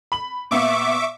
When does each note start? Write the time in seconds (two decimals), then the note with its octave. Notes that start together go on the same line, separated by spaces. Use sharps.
0.12 B5 F#7
0.51 A#2 B3 E5 F5 C#6 D6